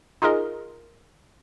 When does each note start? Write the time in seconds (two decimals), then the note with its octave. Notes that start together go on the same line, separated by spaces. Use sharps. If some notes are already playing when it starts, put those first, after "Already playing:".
0.22 D#4 F4 G#4 A#4 D#5